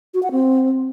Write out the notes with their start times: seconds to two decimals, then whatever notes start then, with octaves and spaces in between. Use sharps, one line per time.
0.14 F#4
0.23 F#5
0.31 C4